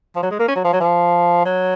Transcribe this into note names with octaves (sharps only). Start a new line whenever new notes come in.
F3
F#3
G#3
A#3
C#4
F#3
F3
F#3
F3
F#3